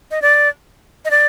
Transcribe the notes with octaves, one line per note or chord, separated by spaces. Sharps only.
D#5
D5
D#5
D5